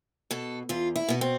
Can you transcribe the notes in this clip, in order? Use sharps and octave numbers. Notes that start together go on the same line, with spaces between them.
B2 A4
E2 F4
E4
B2 B3
C4